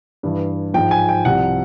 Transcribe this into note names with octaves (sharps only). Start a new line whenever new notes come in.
G2 E3
G#2 F3 G5
G#5
G5
C2 C3 F3 F#5